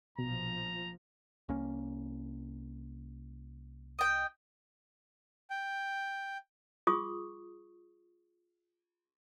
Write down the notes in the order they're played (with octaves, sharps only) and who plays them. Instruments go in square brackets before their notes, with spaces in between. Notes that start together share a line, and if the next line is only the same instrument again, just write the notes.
[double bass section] A#1 F3 [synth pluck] B2 [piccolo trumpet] A#5
[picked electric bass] C2 A#3 C#4
[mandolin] D#5 G5
[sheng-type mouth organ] G5
[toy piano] F4 G#4 C#6 D#6